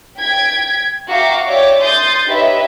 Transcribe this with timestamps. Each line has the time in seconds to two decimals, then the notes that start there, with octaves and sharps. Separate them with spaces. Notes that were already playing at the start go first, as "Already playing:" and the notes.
0.19 G5 G#6 B6 D7
1.08 F#4 E5 F5 G5 A#5 D6
1.45 C#5 D5 E5 G5 D6
1.81 C6 D#6 G6 A6
2.28 D#4 G4 B4 C#5 D#5 E5